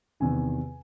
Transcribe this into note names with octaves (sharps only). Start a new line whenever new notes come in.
E2 C3 D#3 G#5